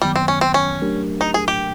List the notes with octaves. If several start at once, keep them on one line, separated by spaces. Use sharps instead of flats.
F#2 D#3 F#3 G3 B3
C4
C#4
C4
C#4
F#3 A3 D4 G4 A#4
D#4
G#4
G4